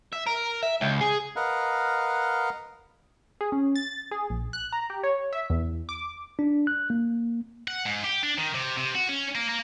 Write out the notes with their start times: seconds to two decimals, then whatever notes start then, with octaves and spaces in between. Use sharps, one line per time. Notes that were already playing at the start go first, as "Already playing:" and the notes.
0.13 E5
0.27 A#4
0.63 E5
0.81 C#2
1.01 G#4
1.36 A#4 B4 D#5 F5 F#5
3.41 G#4
3.52 C#4
3.76 A6
4.11 G#4
4.30 A#1
4.53 F#6
4.73 A#5
4.90 G4
5.03 C#5
5.33 E5
5.50 E2
5.89 D6
6.39 D4
6.67 F#6
6.90 A#3
7.68 F#5
7.85 G#2
8.04 G4
8.23 D4
8.39 D#3
8.55 C3
8.77 C3
8.95 F#4
9.09 C#4
9.35 A#3
9.49 A#3